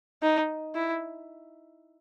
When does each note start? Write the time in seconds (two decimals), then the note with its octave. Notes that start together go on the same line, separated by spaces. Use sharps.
0.22 D#4
0.75 E4